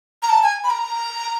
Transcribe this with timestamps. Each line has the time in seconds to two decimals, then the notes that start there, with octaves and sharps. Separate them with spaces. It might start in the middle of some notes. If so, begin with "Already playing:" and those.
0.23 A#5
0.29 A5
0.43 G#5
0.64 B5
0.70 A#5